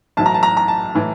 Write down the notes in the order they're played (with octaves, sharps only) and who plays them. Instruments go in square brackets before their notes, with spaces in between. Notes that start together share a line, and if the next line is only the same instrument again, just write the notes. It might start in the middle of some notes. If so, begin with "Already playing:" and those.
[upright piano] B1 A2 E3 A5
A#5
A5
A#5
A#5
A5
A2 E3